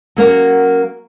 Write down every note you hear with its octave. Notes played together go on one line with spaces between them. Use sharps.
F#3 A#3 C#4 F#4 A#4